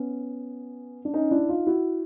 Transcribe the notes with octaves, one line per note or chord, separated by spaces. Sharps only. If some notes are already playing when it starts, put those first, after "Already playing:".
Already playing: B3 C#4
D4
C#4 D#4
D4 E4
D#4 F4
E4 F#4